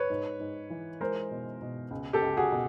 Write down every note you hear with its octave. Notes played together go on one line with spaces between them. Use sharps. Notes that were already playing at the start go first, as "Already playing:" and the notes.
Already playing: B4 C#5
G#2
G#2
E3
G#3 A#4 C5
B2
B2
C#2
G4 A4
C#2
F#4 G#4
B2